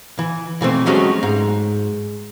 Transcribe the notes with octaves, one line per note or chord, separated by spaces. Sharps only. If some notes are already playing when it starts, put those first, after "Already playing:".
E3
B2 E3 A3 C4
F#3 G#3 A3 C#4 F#4 G4
G#2